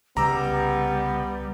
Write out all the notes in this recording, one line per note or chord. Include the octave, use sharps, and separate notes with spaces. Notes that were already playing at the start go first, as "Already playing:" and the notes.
C2 C#3 G3 B3 A#5 D6 E6